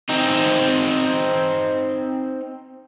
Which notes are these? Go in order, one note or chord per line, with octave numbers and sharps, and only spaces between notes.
C4 D#4